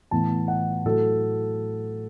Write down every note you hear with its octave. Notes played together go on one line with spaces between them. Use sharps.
A2 E3 B3 A5
F#5
A2 F#3 A3 A4